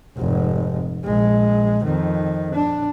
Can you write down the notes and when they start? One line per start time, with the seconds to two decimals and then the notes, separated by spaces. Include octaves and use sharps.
0.18 F1 G#2
1.05 A#1 G#3
1.84 F2 D#3
2.54 D4